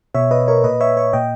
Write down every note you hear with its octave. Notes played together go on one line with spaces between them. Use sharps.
B2 C#5 E5
B4 D#5
A#4 C#5
A#2 B4 D#5
C#5 E5
C#5 E5
A#2 D#5 G5